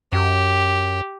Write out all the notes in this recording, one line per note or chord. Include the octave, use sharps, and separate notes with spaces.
F#2 G4